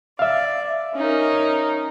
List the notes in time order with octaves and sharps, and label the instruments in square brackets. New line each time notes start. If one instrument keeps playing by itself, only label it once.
[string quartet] D5 [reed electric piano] E5 F5
[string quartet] C#4 D#4 A#4